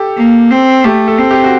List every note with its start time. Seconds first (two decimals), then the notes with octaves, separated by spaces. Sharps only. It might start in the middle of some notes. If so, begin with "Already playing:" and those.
Already playing: G4 A4
0.17 A#3
0.51 C4
0.85 A3 G4
1.08 A4
1.19 C4
1.31 G4
1.44 F#4